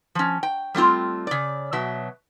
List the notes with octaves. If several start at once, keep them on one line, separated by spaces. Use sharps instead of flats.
F3 C#4
G5
G3 A3 C4 F4
C#3 D5
B2 F#3 E5